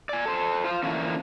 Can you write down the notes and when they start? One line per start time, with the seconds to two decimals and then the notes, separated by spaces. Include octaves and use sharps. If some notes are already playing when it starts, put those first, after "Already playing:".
0.09 D5 G#5
0.26 A4 C5
0.64 F4 C5 F5
0.83 D3 E3 F3 A#3 C#4